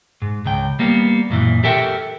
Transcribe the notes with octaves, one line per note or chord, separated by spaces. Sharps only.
G#2
C#2 G5
G3 A#3 B3
F#2 A#2 E3
G4 A4 A#4 E5 F#5 G5